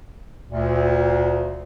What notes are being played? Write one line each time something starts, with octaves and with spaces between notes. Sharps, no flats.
D2 A#2